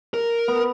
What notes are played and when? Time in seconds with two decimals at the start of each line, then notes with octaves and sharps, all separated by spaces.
0.14 A#4
0.48 B3